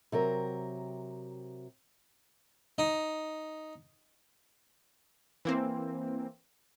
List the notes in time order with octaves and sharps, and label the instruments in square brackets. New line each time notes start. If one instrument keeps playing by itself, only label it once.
[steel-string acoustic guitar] C3 F#3 A#4
[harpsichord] D#4
[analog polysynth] E3 A#3 C4